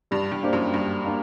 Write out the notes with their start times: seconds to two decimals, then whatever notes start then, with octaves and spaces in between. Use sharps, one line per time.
0.11 G2 G3
0.32 G2
0.43 A#3 D4 G4 C5
0.53 F#2
0.74 G2 G3
1.05 A#3 D4